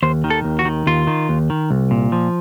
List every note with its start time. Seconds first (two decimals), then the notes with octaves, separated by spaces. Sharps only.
0.03 D#2 C5
0.24 D#3
0.30 A4
0.44 D#2
0.59 F#4
0.65 D#3
0.87 D#2 F4
1.07 D#3
1.29 D#2
1.50 D#3
1.70 C2
1.91 A#2
2.12 F3